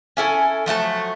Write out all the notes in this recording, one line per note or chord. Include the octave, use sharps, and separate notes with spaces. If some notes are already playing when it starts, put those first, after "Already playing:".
C#4 E4 A4 G#5
F3 F#3 A3 A5